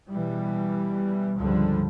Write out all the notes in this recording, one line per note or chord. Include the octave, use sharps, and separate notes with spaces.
B2 E3 G3
C#2 G2 D3 F3 G3